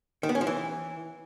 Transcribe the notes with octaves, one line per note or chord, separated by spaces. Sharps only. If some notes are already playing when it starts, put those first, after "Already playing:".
D#3
B3
C#4
F3
E3